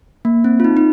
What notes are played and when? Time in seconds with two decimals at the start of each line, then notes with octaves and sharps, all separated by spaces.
0.25 A#3
0.44 C4
0.60 F4
0.64 D#4
0.77 D#4